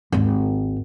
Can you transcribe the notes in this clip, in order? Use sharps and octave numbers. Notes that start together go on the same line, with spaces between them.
G#1 D#2